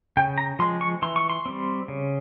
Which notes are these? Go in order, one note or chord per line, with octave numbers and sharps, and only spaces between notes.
C#3 G5
A#5
F3 G#3 C6
C#6
E3 C6
C#6
C6
G3 C4
C#3